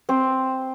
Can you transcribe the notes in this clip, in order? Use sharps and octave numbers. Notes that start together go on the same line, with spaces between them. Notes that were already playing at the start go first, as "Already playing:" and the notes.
C4